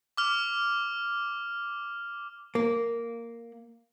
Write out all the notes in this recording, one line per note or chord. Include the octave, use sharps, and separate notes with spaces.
D6 F6 F7
A#3